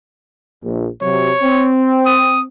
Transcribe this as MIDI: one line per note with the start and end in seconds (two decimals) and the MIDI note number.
0.63 0.87 34
1.02 1.30 48
1.02 1.30 54
1.02 1.70 73
1.42 2.47 60
2.06 2.41 87